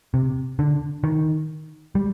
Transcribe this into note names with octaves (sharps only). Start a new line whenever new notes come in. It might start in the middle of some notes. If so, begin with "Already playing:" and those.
C3
D3
D#3
G3